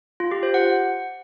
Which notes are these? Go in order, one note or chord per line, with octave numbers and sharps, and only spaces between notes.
F4
G4
C5
F#5